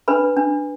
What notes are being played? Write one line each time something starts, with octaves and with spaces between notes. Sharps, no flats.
D4 B4 B5
D4